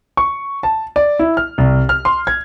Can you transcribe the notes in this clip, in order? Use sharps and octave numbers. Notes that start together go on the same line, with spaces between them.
C#6
A5
D5
E4
F6
C2
F6
C6
G#6